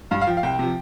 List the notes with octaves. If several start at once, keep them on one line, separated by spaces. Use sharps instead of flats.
G2 F5
F5
F3 G5
F5
C2 G5
C3 F3